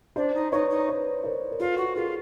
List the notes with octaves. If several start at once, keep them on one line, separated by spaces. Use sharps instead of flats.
D4 C5 D5
D#4
D#4 B4 C#5
D#4
B4 C#5
A#4 C5
A#4
F4 A4 B4
F#4
F4 G#4 A#4